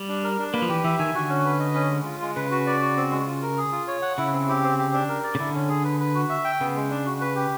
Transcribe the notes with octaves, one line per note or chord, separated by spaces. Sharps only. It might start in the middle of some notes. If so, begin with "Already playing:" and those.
Already playing: G3
D4
A#4
D4
A#3 B4
F3
E3 G4
E3 E5
D#3 G#5
D3 F#4
C#4
B4
D#5
C#4
G#3
F4
G#3
C#3 B4
F#4
D5
F#4
C4
G#3
F4
A#4
G#4
F4
C#5
F#5
C#3 E4
C4
G4
C4
G4
D4
A#4
D5
C#3
D3 E4
C#4
G#4
B4
B4
F#4
E5
G5
C#3 B3
G#3
D4
F#4
B4
G4